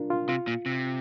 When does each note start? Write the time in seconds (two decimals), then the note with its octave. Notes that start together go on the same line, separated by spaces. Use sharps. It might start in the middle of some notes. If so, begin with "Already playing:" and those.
Already playing: D4 F4 A#4
0.10 F4
0.29 C3 F4
0.47 A#2
0.66 C3